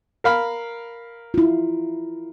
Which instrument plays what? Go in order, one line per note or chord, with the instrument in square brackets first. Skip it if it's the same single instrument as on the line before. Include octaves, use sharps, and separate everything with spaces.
[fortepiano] A#4 F5 B5
[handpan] E4 F4